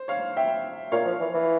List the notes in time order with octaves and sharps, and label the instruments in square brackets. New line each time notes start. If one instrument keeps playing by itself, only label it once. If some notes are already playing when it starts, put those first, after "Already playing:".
Already playing: [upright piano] C5
C#5 F5
E5 G5
[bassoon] A#2 [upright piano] C#5 F5
[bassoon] F3
E3
E3